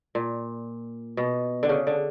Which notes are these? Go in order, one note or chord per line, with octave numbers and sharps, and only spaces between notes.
A#2
B2
D3
C#3
D3